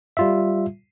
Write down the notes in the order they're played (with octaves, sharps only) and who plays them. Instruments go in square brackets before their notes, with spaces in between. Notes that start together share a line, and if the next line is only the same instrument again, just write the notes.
[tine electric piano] G3 F4 E5